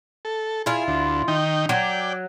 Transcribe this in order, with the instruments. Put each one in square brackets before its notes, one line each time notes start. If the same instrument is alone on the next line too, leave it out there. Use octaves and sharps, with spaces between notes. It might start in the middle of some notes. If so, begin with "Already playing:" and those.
[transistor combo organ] A4
[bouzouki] E4 F4 [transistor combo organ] G#4
[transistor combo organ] D2
D#3 D#4 G5
[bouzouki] F#3 [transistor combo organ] D5 G5